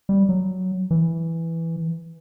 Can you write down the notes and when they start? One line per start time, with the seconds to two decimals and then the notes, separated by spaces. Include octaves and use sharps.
0.09 G3
0.29 F#3
0.91 E3